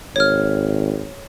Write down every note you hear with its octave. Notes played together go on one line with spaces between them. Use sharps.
G#1 C#5 F6